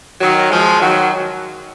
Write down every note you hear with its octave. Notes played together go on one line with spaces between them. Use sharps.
D#3 F#3
F3 G#3
D#3 F#3